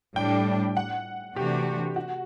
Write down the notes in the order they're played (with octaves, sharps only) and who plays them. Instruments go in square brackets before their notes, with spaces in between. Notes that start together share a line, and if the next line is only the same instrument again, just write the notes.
[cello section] A2 G3 D4 [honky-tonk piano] G5
[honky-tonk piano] F#5
[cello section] C3 E3 A3 D4 F#4 [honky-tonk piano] G4
[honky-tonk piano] F#4